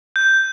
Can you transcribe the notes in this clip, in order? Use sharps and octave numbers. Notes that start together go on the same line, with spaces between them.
G6